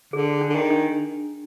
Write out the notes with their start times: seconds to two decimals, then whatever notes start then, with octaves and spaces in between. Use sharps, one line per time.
0.13 D3 G#4
0.41 D4
0.50 D3
0.55 D#3
0.70 D4